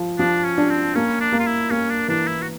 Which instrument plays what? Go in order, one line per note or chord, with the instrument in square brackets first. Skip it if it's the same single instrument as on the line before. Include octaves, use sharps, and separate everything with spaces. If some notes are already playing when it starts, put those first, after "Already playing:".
Already playing: [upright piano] F3
[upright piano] F3 [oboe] D4
[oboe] C#4
[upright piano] D4
[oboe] C4
[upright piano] A#3 [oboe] C#4
[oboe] D4
[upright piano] A#3
[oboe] F4
E4
[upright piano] A#3 [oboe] C#4
[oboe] D4
[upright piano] E3 [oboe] D4
[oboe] E4
F#4